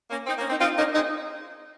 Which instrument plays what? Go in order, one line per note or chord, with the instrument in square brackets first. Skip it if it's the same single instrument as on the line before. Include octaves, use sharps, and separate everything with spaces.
[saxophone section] A#3 C#4
C4 D#4
A#3 C#4
C4 D#4
[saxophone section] C4 D#4 [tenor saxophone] F4
[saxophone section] A#3 C#4 [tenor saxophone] D#4
[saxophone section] G#3 C4 [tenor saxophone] D#4